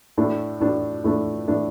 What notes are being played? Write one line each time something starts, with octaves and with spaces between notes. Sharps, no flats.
A2 A3 D4
A2 A3 D4
A2 A3 D4
A2 A3 D4